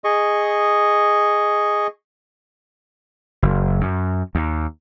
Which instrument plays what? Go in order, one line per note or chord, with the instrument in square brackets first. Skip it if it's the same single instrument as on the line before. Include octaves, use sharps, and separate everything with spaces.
[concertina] G#4 D#5 C#6
[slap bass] F#1
F#2
D#2